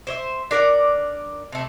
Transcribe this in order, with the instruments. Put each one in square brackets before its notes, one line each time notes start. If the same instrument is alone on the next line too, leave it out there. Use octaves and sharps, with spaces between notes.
[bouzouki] C5 C#5 E5
D4 A#4 D5 F#5
C3 A3